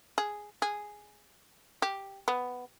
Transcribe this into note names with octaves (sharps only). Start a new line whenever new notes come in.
G#4
G#4
G4
B3